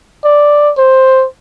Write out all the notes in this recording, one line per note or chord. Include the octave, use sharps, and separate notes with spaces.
D5
C5